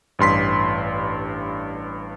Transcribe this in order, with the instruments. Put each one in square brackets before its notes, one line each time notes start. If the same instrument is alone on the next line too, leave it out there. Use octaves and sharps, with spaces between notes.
[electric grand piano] A1 G2 C6 B6